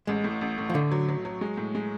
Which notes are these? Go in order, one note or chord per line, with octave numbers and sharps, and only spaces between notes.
A1 G#3
A2
A1
A2
F3
D3 A3
F#3
F#3
F#3
G#3
A2
G#3